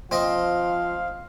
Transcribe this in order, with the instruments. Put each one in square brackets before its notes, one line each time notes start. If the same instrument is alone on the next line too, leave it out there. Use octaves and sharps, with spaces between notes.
[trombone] F3 [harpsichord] C4 D#5 [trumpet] F5